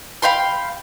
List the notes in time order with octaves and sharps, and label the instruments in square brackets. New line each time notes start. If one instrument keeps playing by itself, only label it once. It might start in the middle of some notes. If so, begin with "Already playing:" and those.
[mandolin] F5 G5 B5 C6